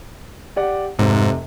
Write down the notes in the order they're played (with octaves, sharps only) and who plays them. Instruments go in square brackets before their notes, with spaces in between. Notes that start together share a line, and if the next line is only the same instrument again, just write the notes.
[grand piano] G4 D5 F#5
[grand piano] F1 C3 [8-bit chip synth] G#2